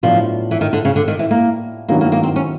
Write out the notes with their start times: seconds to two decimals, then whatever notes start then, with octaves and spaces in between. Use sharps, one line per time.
0.03 A2 F3 F#3 B3 D4 F4
0.51 E3
0.61 D#3
0.73 D3
0.85 C#3
0.96 D3
1.08 D#3
1.19 E3
1.31 A#3
1.89 G2 D#3 F#3 A#3 B3 E4
2.01 A#3
2.12 A#3
2.23 C4
2.36 C#4